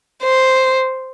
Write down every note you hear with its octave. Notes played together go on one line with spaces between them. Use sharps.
C5